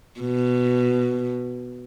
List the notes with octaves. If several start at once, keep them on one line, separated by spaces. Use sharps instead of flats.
B2